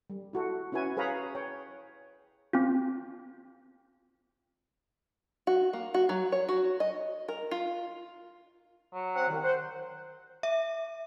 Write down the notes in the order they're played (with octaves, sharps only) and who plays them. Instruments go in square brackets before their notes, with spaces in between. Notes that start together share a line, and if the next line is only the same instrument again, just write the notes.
[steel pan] G3
E4 F#4 A4
C#4 E4 F#4 B4 G#5
G#4 B4 C#5 F5 A#5 B5
C#5 G5
[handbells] C4 F4
[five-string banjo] F#4
A#3
F#4
F#3
C#5
F#4
D#5
A#4
F4
[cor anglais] F#3
[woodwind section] C4 F#5
C2 D#3
[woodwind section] C5 [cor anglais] F#5
[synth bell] E5